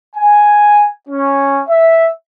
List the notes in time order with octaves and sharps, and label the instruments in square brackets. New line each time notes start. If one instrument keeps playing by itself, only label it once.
[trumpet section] G#5
C#4
E5